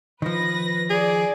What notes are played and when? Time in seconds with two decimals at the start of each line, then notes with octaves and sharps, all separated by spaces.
0.22 D#3 F3 B4 A#6
0.90 G#4 D5